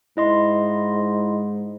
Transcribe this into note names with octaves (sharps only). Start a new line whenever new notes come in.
G#2 E4 D#5 C6